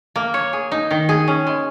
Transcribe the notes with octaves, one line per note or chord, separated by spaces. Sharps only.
A#3
C#5
G#4
D#4
D#3
G#4
C#4
G#3